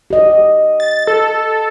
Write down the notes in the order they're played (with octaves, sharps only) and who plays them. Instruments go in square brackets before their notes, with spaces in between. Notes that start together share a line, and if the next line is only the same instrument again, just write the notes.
[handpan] G4 D#5
[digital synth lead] A6
A4